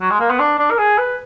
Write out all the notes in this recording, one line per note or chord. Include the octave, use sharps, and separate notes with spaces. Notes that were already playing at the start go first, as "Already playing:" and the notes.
F#3
G#3
A#3
B3
D4
D4
A#4
G#4
B4